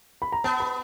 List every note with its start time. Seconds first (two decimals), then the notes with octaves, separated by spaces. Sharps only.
0.22 B5
0.32 A#5
0.44 B3 A5
0.60 B5